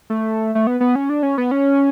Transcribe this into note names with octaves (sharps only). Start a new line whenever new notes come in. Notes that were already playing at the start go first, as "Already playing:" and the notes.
A3
A3
B3
B3
C#4
D4
C#4
B3
C#4